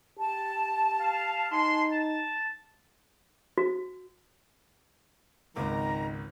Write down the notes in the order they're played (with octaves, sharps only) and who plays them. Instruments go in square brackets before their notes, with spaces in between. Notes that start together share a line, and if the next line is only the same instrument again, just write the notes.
[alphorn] G4 [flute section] A5
[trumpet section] F5
[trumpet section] G#3 C6 [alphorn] D#4
[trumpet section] A5
[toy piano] F#4
[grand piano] G#1 C#2 D6 [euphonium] D#3 [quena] A#5